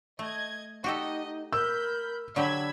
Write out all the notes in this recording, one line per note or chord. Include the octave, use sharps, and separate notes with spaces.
A3 D#5 G#6
D#4 F#4 G4 A4 D#5
A#4 B5 E6 G6
D3 F#3 D4 G4 B5 E6 G#6